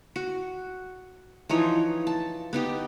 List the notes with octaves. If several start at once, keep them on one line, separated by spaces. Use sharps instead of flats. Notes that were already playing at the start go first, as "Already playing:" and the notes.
F#4
E3 F3 D#4 C#5
A5
B3 D#4 G4